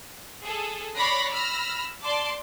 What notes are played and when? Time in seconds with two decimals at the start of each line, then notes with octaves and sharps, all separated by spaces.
0.44 G#4 A4
0.96 C#5 D5 B5 F#6 A#6 C7
1.31 B5 E6 F6 A#6
2.02 D5 A5 C6 D6